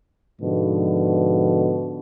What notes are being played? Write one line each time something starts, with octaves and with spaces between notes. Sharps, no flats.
G#2 B2 D3 F3